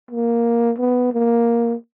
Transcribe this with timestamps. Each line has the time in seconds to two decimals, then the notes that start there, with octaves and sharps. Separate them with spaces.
0.11 A#3
0.78 B3
1.13 A#3